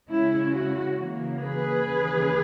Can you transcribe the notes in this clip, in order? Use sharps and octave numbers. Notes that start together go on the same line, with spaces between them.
C#3 G#3 C#4 E4
F#4
C#3 E3 A#3
G#4 B4
D#2 C#3 E3